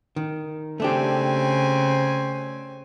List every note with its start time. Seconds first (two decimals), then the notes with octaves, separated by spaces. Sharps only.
0.16 D#3
0.80 C#3 A3 C4 D4 G4 G#5